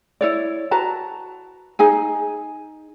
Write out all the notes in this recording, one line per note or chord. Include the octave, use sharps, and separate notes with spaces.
E4 C#5 D5
F#4 B4 A5 A#5
D#4 G#4 G#5